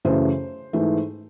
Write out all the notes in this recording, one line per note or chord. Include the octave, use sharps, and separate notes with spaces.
F#2 C#3 E3 A3 C5
G#2 E3 A3